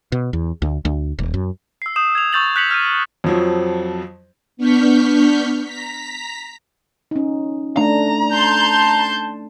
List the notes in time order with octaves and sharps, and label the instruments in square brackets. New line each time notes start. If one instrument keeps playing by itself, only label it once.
[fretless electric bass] B2
E2
D2
D2
D#1
F#2
[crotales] E6 C7
D#6 G6 E7
G#6 F7
C#6 E6 G6 A6 F7 F#7
F#6 G6 B6 C#7 F7 F#7
F6 G6 D#7
[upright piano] F2 F3 F#3
[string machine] B3 D4 C#6 F6 G6 B6
A#5 B6
[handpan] C#4 D#4
[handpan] A3 D4 [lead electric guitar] A#5
[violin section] A5 C6 G6